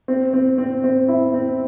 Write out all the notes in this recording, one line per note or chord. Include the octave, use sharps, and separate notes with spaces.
C4
C4
C4
C4
E4
C4